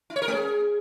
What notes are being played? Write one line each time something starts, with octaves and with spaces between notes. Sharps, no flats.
E4
C#5
A#4
A3
G#4